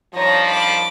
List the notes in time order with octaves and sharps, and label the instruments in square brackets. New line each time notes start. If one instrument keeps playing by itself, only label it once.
[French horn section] G2 D#3 F3 [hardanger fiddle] C#5 A#5
[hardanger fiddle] B5 D6